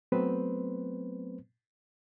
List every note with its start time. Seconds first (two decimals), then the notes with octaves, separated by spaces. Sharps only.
0.12 F#3 A3 B3 C4 B4 C5